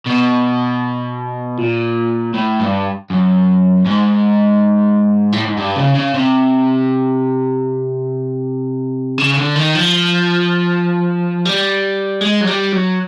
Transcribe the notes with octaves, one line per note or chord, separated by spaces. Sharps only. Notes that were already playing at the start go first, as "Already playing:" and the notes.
B2
A#2
A2
G2
F#2
G#2
A2
G#2
G2
C#3
C#3
C3
C#3
D3
D#3
F3
G3
G#3
F#3
G3
F#3